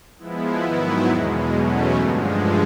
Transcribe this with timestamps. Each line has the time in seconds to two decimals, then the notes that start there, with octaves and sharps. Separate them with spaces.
0.19 F3 G#3 B3 E4
0.62 G#2 D#3 F#3 B3 E4
1.07 E2 B2 G#3
1.52 E2 B2 F#3 A3 C#4
1.96 G2 D3 F3 G#3